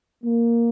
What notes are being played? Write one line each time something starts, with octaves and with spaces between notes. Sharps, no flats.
A#3